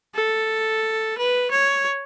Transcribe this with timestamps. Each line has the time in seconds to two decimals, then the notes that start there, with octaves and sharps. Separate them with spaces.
0.15 A4
1.18 B4
1.51 C#5